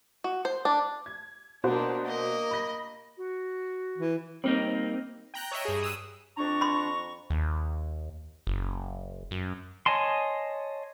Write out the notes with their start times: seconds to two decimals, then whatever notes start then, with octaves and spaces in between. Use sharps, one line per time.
0.24 F#4
0.45 C5
0.65 D4
1.06 G#6
1.64 B2 A#3 D4 F#4 C5
2.05 A#3 D#5
2.51 B5 A#6
3.17 F#4
3.98 E3
4.44 G3 A#3 C4 D#4
5.34 G5 A#5 F#6 G6
5.51 C#5 D#5 E5 G5
5.65 G2 G#4
5.83 D#6 E6 F#6
6.37 F2 D4 A#5 C#6
6.61 B5 C6
7.30 D#2
8.47 F#1
9.31 F#2
9.86 C#5 D#5 G#5 A5 C6